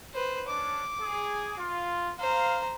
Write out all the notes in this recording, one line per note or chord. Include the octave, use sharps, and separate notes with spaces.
B4 C5
C#4 D4 D6
G#4
F4
C5 F5 A#5